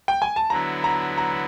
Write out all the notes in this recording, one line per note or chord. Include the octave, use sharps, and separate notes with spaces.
G5
G#5
A5
D3 F#3 B3 E4 A#5
A#5
A#5